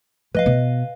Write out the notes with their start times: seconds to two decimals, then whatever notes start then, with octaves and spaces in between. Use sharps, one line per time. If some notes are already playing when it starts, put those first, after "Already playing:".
0.35 F3 B4 D#5 F5
0.46 B2